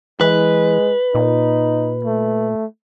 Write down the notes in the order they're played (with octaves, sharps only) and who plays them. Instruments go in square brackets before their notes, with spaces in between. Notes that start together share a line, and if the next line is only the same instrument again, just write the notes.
[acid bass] E3 [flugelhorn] G#3 [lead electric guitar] B4
[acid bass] A#2 [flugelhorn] D#4
[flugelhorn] A3